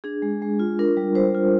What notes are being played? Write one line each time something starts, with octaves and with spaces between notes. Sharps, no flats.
D4 G#4
G#3
G#3
F4
D4 A#4
G3
G3 C5
F4